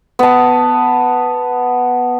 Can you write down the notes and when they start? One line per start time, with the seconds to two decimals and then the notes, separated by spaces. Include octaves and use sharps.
0.19 B3 A5